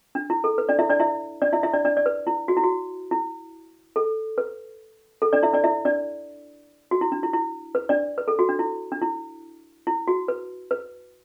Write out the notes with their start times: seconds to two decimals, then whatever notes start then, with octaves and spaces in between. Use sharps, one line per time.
0.15 D4
0.30 E4
0.44 A4
0.58 B4
0.69 D4 D5
0.79 E4 E5
0.89 D4 D5
0.99 E4 E5
1.42 D4 D5
1.53 E4 E5
1.63 E4 E5
1.73 D4 D5
1.85 D4 D5
1.97 D5
2.06 B4
2.27 E4
2.48 F#4
2.56 E4
2.63 F#4
3.11 E4
3.96 A4
4.38 B4
5.22 A4
5.33 D4 D5
5.43 E4 E5
5.53 D4 D5
5.64 E4 E5
5.85 D4 D5
6.91 F#4
7.01 E4
7.12 D4
7.23 E4
7.33 E4
7.75 B4
7.89 D4 D5
8.18 B4
8.28 A4
8.39 F#4
8.49 D4
8.59 E4
8.92 D4
9.02 E4
9.87 E4
10.08 F#4
10.28 B4
10.71 B4